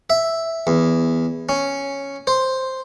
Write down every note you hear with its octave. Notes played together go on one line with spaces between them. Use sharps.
E5
E2
C#4
C5